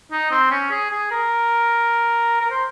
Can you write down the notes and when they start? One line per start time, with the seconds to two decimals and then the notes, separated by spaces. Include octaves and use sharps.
0.12 D#4
0.31 C4
0.51 C#4
0.71 G#4
0.91 G#4
1.11 A#4
2.41 A#4
2.50 C5